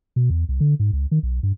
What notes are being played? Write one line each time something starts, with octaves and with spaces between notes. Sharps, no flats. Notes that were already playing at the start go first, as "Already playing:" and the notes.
B2
E2
C2
D3
G#2
C#2
D#3
B1
G2